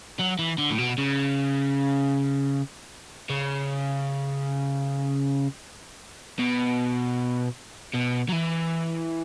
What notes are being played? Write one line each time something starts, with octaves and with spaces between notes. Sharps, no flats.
F#3
E3
D3
A2
B2
C#3
C#3
B2
B2
F#3
E3